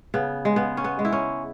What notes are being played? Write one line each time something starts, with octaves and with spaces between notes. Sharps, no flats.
C#3 B3
G#3
C#3 B3
C#4
B3
G#3
E4
C#4